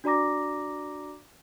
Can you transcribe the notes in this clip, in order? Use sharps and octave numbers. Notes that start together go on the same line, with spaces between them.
D4 F#4 D5 A#5 D6 A#6